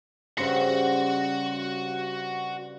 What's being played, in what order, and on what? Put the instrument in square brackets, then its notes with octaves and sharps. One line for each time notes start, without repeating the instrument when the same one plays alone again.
[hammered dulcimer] G2 C#3 C5 [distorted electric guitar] F#4 F#5